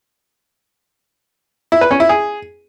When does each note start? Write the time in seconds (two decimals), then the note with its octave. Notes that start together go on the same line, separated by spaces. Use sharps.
1.72 E4
1.81 B4
1.91 C#4
2.00 E4
2.09 G#4